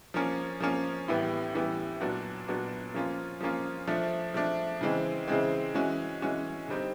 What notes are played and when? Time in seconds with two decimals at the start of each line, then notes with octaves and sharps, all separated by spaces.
0.14 F3 A#3 C#4
0.60 F3 A#3 C#4
1.08 A2 E3 G3 B3
1.54 A2 E3 G3 B3
2.01 A#2 F#3 B3 D4 F#4
2.48 A#2 F#3 B3 D4 F#4
2.94 F3 A#3 C#4 F4
3.41 F3 A#3 C#4 F4
3.88 F3 A3 D4
4.34 F3 A3 D4
4.81 C#3 E3 G#3 C4
5.28 C#3 E3 G#3 C4
5.74 E3 G#3 C#4 F#4
6.22 E3 G#3 C#4 F#4
6.68 D3 G3 C4 D#4